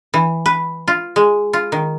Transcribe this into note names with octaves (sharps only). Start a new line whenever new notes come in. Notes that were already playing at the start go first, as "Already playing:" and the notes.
E3
B4
F4
G#3
F4
D#3